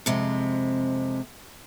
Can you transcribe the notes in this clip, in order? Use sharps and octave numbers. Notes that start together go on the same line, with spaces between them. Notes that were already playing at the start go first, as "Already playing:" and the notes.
F2 C3 G#3